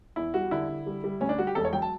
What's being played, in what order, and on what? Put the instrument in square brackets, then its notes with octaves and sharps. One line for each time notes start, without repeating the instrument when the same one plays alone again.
[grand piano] E2 E4
G3 F#4
D3 E4
D3
G3
G3
D2 C#4
D4
G3 F#4
G4
E1 A4
C#5
F#3 G5
A5